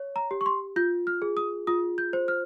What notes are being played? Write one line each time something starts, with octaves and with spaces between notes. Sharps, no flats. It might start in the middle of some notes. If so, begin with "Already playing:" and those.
Already playing: C#5
A#5
G4
C#6
C6
F4 G6
F6
G#4
D#6
F4 D#6
G6
C5
F6